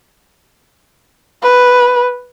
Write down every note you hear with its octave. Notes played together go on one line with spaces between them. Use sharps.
B4